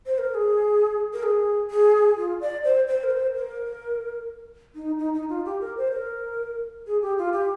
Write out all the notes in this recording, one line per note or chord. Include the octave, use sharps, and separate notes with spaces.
C5
A#4
A#4
G#4
A#4
G#4
G#4
F4
D5
C5
C5
A#4
C5
A#4
D#4
D#4
D#4
F4
G4
A#4
C5
A#4
G#4
G4
F4
G4